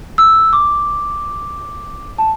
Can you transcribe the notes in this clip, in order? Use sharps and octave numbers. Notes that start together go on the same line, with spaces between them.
E6
D6
A5